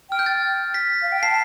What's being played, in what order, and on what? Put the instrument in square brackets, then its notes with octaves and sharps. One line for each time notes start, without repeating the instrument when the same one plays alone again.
[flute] G5 [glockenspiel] F6
[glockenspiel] G6
A6
B6
[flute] F5
G5
[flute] A5 [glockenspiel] C7